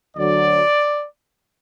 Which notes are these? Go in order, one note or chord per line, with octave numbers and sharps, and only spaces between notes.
D2 D3 F#3 D5